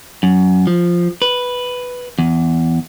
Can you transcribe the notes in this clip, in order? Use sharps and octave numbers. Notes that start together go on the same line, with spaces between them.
F#2
F3
B4
E2